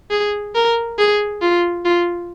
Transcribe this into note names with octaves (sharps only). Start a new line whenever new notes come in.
G#4
A#4
G#4
F4
F4